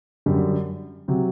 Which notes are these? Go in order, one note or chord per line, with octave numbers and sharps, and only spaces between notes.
F#2 D3 G3
C3 F#3